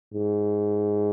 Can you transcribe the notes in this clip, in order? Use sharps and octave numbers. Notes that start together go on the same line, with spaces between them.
G#2